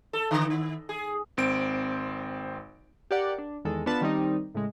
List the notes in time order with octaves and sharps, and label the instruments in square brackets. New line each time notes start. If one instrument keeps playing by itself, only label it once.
[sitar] A4
D3
D#3
G#4
[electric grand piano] G#1 C4 D7
[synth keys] G4 A#4 D5 F#5
D4
E2 D#3 G#3 A4
B3 D4 F4 B4 A5
D#3 G3 C4 D#4
A2 C#3 G#3